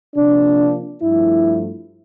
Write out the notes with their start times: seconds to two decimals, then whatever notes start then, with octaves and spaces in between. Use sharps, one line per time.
0.15 C3 F3 A#3 D4
1.01 G2 F3 A3 E4